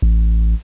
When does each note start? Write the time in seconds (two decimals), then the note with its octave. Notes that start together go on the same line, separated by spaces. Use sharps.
0.02 A1